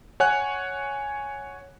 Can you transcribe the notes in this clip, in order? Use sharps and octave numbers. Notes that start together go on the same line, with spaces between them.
C#5 F#5 G#5 F#6